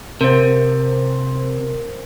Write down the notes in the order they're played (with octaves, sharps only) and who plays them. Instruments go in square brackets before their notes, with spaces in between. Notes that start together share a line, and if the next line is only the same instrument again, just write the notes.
[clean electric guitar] C3 [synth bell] A#4 C5